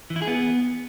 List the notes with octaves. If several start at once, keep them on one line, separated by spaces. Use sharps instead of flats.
E3
E4
G#4
B3